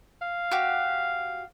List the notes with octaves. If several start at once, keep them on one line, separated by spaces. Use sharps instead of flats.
F5
F#4 G4